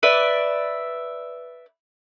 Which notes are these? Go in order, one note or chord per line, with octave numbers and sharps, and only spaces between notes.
B4 D5 E5